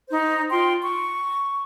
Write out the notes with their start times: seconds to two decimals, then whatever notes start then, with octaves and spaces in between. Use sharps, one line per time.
0.09 D#4 C5
0.50 F4 G5 C6
0.83 C#6